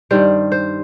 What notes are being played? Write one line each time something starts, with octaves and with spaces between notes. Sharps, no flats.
G2 D#3 G3 C5
C5